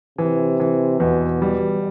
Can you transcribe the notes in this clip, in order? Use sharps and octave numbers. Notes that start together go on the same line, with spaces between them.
C3 E3
E3
E2 B2
B2 G3